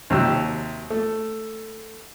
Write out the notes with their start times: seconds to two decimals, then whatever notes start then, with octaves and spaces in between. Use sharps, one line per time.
0.10 D#2 C3 F#3 G4 E6
0.90 A3